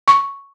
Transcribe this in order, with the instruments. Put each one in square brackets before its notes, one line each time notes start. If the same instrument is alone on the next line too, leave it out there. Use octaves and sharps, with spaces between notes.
[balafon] C#6